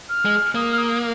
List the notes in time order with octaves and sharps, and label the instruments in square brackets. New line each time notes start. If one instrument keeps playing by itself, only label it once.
[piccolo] F6
[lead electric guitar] G#3
[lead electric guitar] A#3 [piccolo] D#6
[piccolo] F6
D#6